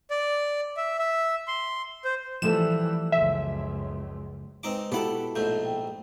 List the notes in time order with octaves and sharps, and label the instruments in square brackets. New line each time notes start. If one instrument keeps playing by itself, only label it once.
[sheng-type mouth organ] D5
E5
E5
C6
C5
[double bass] E3 G3 [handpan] F3 A3 A4 [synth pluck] E7
[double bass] F#1 C#2 [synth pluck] E5
[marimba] G#3 B4 [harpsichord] C4 D#4 D6
[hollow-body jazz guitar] B2 E4 A4 [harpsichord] G4 F#5
[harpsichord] A#1 G#2 A3 [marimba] G6
[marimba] G5